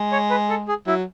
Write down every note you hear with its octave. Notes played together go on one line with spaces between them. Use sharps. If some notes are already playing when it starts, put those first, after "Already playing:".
Already playing: G#3
C#5
B4
A4
G#4
F#3 E4